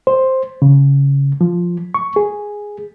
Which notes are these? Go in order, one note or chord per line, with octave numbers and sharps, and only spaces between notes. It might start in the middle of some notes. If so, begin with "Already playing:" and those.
C5
C#3
F3
C#6
G#4